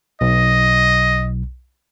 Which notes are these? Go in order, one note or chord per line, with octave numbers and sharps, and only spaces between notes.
B1 D#5